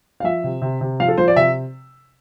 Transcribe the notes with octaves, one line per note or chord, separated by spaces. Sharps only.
F5
F3 E5
C3
C3
C3
F3 F5
A4
F3 C5
D5
C3 E5